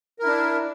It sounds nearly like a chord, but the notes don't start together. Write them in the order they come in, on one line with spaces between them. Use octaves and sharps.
A#4 E4 D4